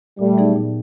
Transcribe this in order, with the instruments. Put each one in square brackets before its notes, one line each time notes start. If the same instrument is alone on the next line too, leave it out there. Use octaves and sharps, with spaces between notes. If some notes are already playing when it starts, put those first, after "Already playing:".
[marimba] A#2 [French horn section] G3 A3
[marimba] F#3 B3 D#4 G#4
A#2